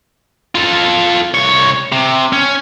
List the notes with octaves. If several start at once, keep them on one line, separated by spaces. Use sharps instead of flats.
F4 A4
C2 C#5
C3
C#4